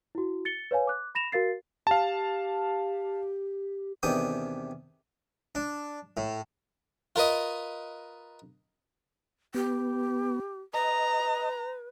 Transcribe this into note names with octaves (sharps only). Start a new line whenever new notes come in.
E4 F#4
A6 C#7 G7
B4 C#5 F5 G#5
D6 F#6
B5 A#6 E7 F7
F#4 A#4 F5 A6 C7
G4 F5 A5
E2 C3 D#3 D4 G5 D#6
D4
A2
F4 A#4 B4 D#5
B3 G4
B4 D#5 A#5